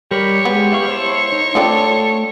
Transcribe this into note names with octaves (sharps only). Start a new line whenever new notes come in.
G3 G4 A#4 C#5 B5
G#3 B3
E4 F5 C#6
E4 C5 A5
D#4
A3 C4 D4 F4 A4